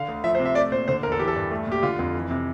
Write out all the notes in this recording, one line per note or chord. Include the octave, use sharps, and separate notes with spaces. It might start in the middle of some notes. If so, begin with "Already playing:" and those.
Already playing: D3 F5
D2
F3 E5
C5
C3
E5
A3 D5
A#2 C5
D3 C5
E2 A#4
A4
E3 G4
A4
G2
A3
A#2 G4
D3 F4
F2
E3
C3